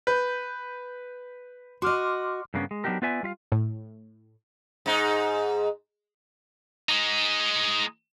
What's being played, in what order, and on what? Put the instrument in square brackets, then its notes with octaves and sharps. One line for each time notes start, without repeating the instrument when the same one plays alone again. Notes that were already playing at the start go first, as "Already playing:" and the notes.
[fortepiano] B4 [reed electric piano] G6
[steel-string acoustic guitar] F#4 D#5 [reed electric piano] C6 D6 F6
[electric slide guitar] G2 C#3 A#3 B3 C#4
G#3
F#3 B3 D4 D#4 G4 A#4
B3 F4 B4 D5 E5 G#5
G3 F4 E5 F5
[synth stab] A2
[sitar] G#2 D#4
[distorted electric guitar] G#3 D#4